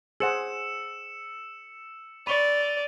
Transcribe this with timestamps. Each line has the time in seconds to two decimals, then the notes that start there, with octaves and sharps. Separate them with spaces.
0.20 G#4 C5 F#5 E6 C#7 E7
2.27 D5 B5 C#6 D#7 F7 G7